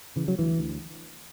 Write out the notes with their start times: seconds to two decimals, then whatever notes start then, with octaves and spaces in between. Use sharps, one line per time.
0.16 C#3 E3
0.28 F#3
0.38 D2 E3
0.59 D2